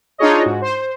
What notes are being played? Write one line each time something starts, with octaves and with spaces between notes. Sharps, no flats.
D4 D#4 F4 G#4 C#5 D#5
G#2 F#4
C5